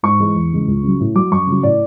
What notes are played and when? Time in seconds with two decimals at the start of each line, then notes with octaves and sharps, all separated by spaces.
0.03 G#2 C#6
0.20 E3 G#3
0.35 E2
0.52 C#3 E3 G#3
0.68 C#2
0.83 C#3 F#3
1.00 A2
1.15 F#3 D6
1.31 F#2 C#6
1.47 C#3 F#3
1.63 A2 D5